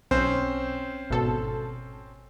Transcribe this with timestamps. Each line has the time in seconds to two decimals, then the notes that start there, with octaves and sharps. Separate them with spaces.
0.11 B1 C4 C#4 C5
1.10 G#1 B2 A4